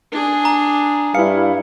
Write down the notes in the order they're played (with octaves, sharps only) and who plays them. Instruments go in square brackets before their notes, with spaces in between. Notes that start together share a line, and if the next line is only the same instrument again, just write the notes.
[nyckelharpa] D4 G#4
[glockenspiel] A#5
[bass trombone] G2 [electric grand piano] E4 B4 F5 [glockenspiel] C#7